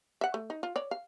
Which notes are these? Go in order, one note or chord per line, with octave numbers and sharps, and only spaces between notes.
E5 F#5
A3
D#4
F4
C#5 D5
F5